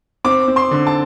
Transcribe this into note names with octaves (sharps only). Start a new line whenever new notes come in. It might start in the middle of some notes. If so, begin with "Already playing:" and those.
C4 D6
C4
C6
D3
A5